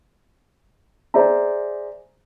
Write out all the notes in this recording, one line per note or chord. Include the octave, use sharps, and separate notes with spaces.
G#4 C5 D5 E5 A#5